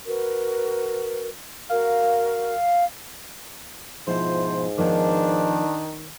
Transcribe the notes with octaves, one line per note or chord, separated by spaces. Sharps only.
F#4 A#4 B4
F#4 A#4 F5
G#2 B2 F3 E4 F4 C5
D#3 F3 B3 D4 C#5